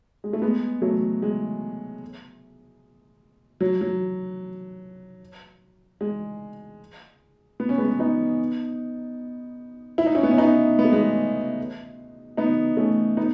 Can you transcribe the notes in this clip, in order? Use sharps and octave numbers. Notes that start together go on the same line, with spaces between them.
G#3
A3
G#3 B3
F#3 A3
G#3
F#3
F#3
G#3
B3
C#4
G#3 B3
B3 D#4
E4
D#4
C#4 E4
B3
C#4
B3 D#4
B3
A3
G#3 B3
B3 D#4
A3 C#4
B3 D#4